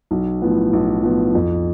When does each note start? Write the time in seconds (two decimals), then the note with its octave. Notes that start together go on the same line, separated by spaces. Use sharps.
0.11 B1
0.42 A2 F3 B3
0.73 B1
1.03 A2 F3 B3
1.35 F2